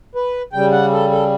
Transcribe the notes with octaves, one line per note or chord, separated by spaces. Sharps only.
B4
C#3 G3 G5
F#5
A4
A4